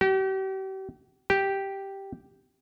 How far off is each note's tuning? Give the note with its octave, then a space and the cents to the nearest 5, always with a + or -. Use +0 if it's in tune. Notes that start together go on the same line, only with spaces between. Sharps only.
G4 -40
G4 -5